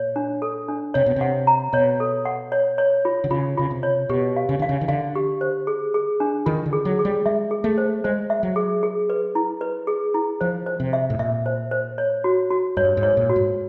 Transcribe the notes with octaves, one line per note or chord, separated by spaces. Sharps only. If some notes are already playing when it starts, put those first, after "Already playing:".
Already playing: A#2 C#5
D4
A4
D4
C3 C#5
B2
C3 F#5
A#5
B2 C#5
A4
F#5
C#5
C#5
F4
D3
C#3 F4
C#3 F4
C3
C#5
B2 G4
F5
C#3
D3 F5
C#3
D#3
D3 F5
G4
C5
G#4
G#4
D4
D#3 F4
D3
G#4
F#3
G#4
G3
G#3 E5
G#4
A3
C5
G#3 C5
E5
F#3
G#4
G#4
B4
E4
B4
G#4
E4
F3 C5
C5
C3
E5
A2
A#2 E5
C5
C5
C#5
F#4
F#4
G2 C#5
G#2
C#5
A#2
F#4
G#2